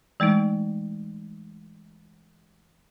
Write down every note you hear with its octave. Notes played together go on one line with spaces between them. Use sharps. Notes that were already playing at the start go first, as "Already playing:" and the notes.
E3 G#3 A3 D#4